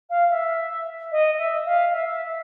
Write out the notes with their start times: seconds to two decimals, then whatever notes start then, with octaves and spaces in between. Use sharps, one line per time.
0.09 F5
0.30 E5
1.11 D#5
1.38 E5
1.65 F5
1.93 E5